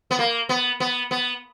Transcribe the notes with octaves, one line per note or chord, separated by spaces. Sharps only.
B3
A#3
B3
B3
B3